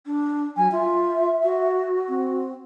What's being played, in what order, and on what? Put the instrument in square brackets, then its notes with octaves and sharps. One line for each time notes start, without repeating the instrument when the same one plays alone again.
[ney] D4
[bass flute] F#3 [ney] G#5
[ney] F4 [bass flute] E5
[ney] F#4
[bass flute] C4